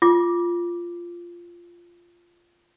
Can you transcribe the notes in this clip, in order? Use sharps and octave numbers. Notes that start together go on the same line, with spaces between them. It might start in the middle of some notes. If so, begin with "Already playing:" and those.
F4 D6